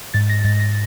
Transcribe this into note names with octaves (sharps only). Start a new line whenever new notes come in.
G#2 A6
A#6
G#2 A6
A#6